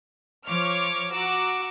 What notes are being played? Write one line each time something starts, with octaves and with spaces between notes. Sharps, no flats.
F3 C#5 C#6 D6 F6
F#4 A#5 D6 E6